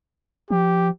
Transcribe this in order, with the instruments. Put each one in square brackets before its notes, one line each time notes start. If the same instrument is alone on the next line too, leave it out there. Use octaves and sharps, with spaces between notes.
[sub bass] F3 [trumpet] G4